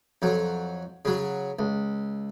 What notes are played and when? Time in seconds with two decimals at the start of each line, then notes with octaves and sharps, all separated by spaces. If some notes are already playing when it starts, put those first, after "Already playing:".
0.22 F2 F#3
1.05 C#3 F#3
1.59 C#2